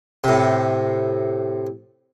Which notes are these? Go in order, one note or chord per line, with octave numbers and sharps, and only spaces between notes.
A2 C3